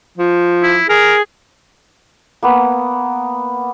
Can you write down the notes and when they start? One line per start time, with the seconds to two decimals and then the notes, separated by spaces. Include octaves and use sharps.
0.18 F3
0.63 E4
0.89 G#4 A#4
2.43 A#3 B3